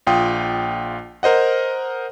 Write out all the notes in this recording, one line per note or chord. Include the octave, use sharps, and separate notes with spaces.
A#1 F4 G5 D#6
A#4 C5 D#5 F#5